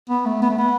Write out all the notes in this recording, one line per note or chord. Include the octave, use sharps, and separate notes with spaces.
B3
A3
B3
A3
B3